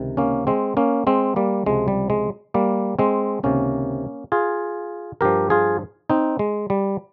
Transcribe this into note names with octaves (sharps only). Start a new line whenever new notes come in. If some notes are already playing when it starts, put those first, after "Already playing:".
Already playing: C#2 C3 D#3
A#3 C#4
G#3 C4
A#3 C#4
G#3 C4
G3 A#3
C#2 C3 F3 G#3
G3
G#3
G3 A#3
G#3 C4
C#2 C3 D#3 A#3 C#4
F4 G#4
G2 F3 G4 A#4
F4 G#4
C4 D#4
G#3
G3